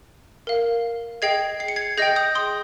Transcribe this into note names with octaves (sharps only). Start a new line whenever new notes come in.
A#4 F5
G#4 D#5 G5 G#6 C7
C7
C#7
G#6 C7
G#4 D#5 G5 G6 A#6
D#6 G6
C6 D#6